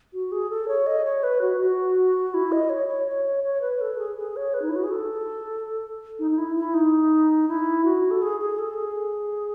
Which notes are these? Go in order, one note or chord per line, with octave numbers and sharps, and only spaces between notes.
F#4
G#4
A4
C#5
D#5
C#5
B4
F#4
F#4
E4
D#5
C#5
C#5
C#5
C#5
C#5
B4
A4
G#4
G#4
C#5
B4
D#4
E4
F#4
G#4
A4
D#4
D#4
E4
E4
D#4
E4
F#4
A4
G#4
G#4
A4
G#4